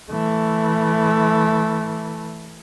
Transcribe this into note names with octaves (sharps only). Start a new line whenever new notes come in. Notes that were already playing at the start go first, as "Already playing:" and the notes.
E3 A3